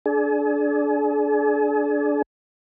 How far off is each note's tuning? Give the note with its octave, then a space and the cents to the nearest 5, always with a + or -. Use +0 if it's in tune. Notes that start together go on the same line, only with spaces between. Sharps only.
D4 -5 G#4 +40